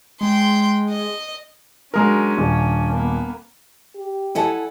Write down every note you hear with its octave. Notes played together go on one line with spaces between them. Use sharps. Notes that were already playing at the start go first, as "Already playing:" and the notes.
G#3 G5 C6
D#5
F#3 G#3 C#4 D4 A#4
D#1
A#3 B3
G4
E4 A4 D#5 F#5 G#5 A5